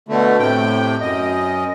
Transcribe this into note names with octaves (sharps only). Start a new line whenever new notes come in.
B2 D3 A3
A2 C3 G5
F#2 D#5